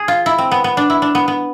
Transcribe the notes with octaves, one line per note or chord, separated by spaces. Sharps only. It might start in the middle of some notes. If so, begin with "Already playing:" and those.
Already playing: G#4
F4
E4
C4
B3
B3
D4
E4
D4
B3
B3